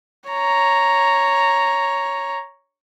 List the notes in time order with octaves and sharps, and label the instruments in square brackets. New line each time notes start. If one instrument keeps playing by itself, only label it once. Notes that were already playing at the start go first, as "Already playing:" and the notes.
[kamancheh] C#5 A#5